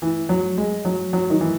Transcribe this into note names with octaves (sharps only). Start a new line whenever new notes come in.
E3
F#3
G#3
F#3
F#3
D#3
E3